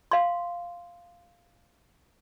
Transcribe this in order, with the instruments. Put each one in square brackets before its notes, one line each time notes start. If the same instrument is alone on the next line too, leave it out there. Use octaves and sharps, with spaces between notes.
[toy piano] F5 C6